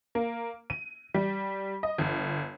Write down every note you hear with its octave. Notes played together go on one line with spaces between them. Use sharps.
A#3
D#7
G3
D#5
G1